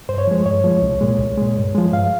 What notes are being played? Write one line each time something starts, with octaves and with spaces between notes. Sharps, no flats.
G2 C5
C#5
F3 G#3
G2 C#5
F3 G#3
C2
A#2 G#3
C2
A#2 G#3
G2
F3 G#3
G2 F5